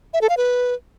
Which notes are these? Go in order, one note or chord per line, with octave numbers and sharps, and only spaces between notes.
E5
A4
F5
B4